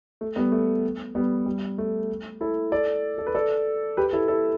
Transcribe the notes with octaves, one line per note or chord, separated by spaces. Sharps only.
A3
G3 B3
A3
G3 B3
G3
A3
E4 A4
A4 D5
A4
B4
A4 D5
G4 B4
E4 A4
E4 A4